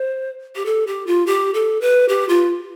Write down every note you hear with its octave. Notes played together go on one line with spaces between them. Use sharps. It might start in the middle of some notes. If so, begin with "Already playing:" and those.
Already playing: C5
G4
A4
G4
F4
G4
A4
B4
G4
F4